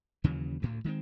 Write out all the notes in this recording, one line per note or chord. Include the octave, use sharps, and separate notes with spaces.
D#2 C#3 E3 F#3
D2 A2
D#3 G#3 B3 C4